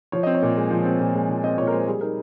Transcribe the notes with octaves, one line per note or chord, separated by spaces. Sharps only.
F3 C#5
C4 D#5
C#5
A#2
G#3
F3
C4
A#2
G#3
F3
C4 D#5
A#2 C#5
A#4
G#3 C5
G3 G#4
D#4 A#4